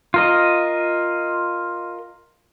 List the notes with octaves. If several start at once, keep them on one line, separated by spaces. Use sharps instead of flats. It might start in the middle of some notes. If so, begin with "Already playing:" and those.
F4 A#4 D#5